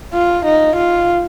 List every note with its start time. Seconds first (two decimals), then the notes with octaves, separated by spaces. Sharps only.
0.13 F4
0.45 D#4
0.76 F4